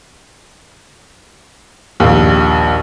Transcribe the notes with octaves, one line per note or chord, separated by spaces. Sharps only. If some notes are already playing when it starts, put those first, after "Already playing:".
A#1 D#2